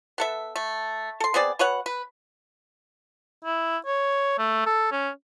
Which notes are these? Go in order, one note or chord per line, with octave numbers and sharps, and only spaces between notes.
B3 A4 E5
A3
A4 C6
B3 C4 G#4 D5
B2 B4 C#5 F#5
B4
E4
C#5
A3
A4
C#4